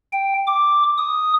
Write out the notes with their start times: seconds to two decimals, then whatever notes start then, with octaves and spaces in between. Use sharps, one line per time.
0.13 G5
0.47 D6
0.98 D#6